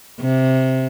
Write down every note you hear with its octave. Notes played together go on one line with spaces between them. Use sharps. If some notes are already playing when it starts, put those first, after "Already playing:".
C3